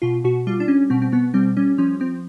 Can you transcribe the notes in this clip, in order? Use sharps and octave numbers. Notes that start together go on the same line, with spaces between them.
B2 F4
B2 F#4
G3 F4
D4
G3 C#4
B2 C4
C4
B2 B3
G3 C4
G3 C#4
F3 C#4
F3 C4